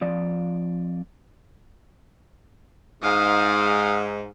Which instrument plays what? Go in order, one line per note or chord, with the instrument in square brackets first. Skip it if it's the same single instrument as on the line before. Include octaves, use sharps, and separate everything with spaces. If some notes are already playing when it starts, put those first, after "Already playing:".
[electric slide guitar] F2 F3 D5
[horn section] G#2 [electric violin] F5 D#6